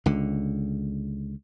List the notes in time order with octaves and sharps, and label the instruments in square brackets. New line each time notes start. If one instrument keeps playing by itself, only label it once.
[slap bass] C#2 D3